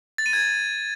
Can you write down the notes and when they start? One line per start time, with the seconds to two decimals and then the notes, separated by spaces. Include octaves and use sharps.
0.18 A6
0.26 D#7
0.33 G#6